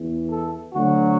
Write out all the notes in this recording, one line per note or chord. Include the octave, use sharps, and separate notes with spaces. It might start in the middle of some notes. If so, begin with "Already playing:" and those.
Already playing: E2 E3
A4
D2 D3 F#3 F#4